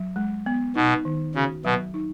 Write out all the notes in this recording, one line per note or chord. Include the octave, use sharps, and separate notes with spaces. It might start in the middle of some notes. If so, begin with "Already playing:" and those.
Already playing: F#3
G#3
B3
B2 D#4
D#3
C#3 F#4
B2 F#3
D#4